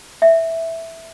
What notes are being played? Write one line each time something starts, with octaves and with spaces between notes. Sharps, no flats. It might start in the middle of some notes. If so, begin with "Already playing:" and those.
E5